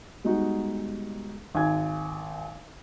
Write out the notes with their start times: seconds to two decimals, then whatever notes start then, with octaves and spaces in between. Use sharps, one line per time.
0.24 G3 G#3 B3 D#4 F#4
1.55 G#1 G#5 G#6